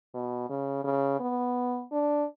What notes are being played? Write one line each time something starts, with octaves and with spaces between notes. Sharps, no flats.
B2
C#3
C#3
B3
D4